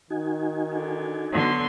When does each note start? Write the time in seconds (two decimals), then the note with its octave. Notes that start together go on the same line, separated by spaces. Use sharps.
0.10 D#3 D#4 F#4 G#5
0.73 D3
1.34 D3 F#3 B3 C6